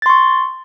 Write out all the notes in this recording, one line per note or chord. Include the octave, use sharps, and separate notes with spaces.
C6 C#6 A6